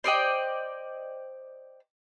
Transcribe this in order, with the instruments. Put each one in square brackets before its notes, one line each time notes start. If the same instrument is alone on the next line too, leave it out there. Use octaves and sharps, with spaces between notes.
[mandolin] C5 D5 D#5 G5